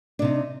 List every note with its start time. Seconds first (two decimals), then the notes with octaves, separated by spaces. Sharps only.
0.19 D4
0.22 C3
0.25 D#4